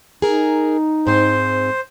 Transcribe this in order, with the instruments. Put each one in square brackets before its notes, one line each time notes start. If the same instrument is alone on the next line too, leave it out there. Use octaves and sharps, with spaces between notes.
[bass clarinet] D#4 [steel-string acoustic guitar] G#4 A#4
[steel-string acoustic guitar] G#2 C4 [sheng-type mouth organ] C5